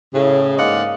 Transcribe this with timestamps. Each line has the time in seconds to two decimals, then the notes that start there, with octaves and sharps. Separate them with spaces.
0.13 A2 C#3
0.58 G#2 A#3 D5 D#5 F5 F#5